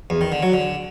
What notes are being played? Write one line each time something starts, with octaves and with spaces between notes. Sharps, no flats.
E2
D#3
D3
F#3
D3